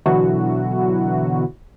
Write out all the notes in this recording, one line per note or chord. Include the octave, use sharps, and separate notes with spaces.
B2 D3 E3 F#3 E4 F#4